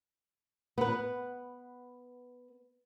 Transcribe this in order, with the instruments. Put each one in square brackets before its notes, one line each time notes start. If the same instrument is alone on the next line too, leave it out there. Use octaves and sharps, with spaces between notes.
[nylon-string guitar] B3 B4